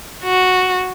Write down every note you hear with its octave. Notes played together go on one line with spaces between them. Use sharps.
F#4